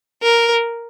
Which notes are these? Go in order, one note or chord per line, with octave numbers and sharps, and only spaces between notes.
A#4